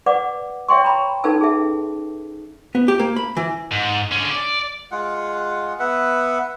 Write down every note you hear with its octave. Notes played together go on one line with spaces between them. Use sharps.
B4 D5 F#5 D6
C#5 E5 G5 C6 C#6
A#5 B5
C#4 D#4 A4 B4 A5 E6
G#4 E5
B3
G4
A#3
B5
E3
G#2
D3 C#4
D5
G#3 F4 F#5
B3 B4 E5 F#5